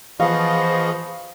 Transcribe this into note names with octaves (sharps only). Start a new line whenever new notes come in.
E3 F3 B3 G#4 D#5 F5 C#6